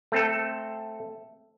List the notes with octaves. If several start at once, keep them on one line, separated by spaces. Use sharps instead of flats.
A3 C4 A4